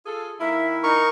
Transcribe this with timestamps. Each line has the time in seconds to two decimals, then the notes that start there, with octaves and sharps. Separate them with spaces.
0.06 F4 G#4 A4
0.40 D#3 A#3 E4 E5
0.84 D#4 A#4 C#6